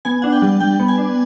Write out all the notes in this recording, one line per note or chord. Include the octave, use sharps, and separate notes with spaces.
B3 G#5
D4 F#5
G5
G3
G3 G5
B3
G#5
D4